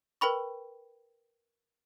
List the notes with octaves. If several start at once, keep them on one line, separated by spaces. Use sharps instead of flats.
A#4 B4 G5 B5 C#6